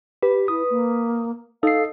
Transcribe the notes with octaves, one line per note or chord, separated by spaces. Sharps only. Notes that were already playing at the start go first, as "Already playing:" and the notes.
G4 B4
E4 D#6
A#3
D#4 A4 F5 C7